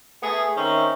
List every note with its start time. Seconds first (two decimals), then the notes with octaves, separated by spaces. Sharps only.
0.23 A3 B3 G#4
0.57 D#3 C4 C#4 D#4 E5